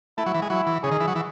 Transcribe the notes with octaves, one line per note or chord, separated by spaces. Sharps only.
A3 E4
F#3
E3
G#3
F#3 E4
E3
C#3 G#4
D#3
E3
F#3
E3